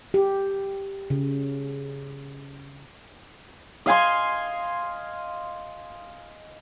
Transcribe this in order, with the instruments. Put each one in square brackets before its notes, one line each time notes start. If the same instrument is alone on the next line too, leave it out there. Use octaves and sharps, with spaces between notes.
[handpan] G4
C#3
[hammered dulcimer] D#5 F5 G#5 C6